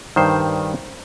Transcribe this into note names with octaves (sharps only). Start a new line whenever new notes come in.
G2 D#3 G3 C5